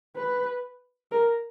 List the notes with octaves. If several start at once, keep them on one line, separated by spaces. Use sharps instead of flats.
B4
A#4